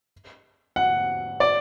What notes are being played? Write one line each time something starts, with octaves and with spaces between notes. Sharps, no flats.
F#5
D5